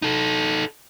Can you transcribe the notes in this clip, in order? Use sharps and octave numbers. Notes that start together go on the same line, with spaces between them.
D#4 A4